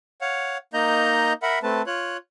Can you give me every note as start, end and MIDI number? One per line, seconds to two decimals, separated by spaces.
0.21 0.57 73
0.21 0.57 77
0.21 0.57 78
0.74 1.33 58
0.74 1.33 63
0.74 1.33 75
0.74 1.33 82
0.74 1.33 91
1.43 1.59 70
1.43 1.59 76
1.43 1.59 78
1.43 1.59 83
1.63 1.82 57
1.63 1.82 60
1.63 1.82 71
1.63 1.82 81
1.87 2.17 65
1.87 2.17 73
1.87 2.17 90